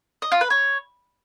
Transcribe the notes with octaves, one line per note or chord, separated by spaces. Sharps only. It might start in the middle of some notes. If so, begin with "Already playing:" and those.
D#5
F4
B4
C#5